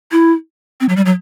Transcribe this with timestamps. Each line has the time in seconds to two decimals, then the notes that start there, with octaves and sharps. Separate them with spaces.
0.12 E4
0.80 C4
0.89 F#3
0.96 G3
1.06 F#3